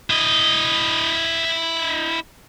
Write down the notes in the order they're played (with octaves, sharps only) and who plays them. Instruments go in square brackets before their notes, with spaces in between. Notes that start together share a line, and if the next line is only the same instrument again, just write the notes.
[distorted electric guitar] E4 D#5